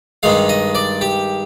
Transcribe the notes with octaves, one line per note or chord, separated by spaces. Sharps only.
G2 D#3 G#3 F5
D#5
D5
G4